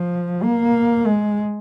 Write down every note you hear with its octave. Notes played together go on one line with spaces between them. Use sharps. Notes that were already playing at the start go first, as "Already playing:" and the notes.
Already playing: F3
A#3
G#3